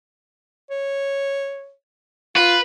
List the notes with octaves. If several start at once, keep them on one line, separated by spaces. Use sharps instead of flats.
C#5
F4 B4